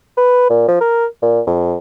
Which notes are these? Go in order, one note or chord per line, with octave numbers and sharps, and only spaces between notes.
B4
A#2
F3
A#4
A#2
F2